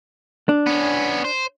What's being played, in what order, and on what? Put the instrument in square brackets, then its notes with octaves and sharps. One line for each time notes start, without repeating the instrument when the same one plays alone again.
[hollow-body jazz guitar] D4
[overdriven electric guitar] B3 C#4
C5